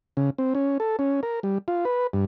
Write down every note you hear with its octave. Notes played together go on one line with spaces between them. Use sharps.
C#3
C4
C#4
A4
C#4
A#4
G3
F4
B4
G2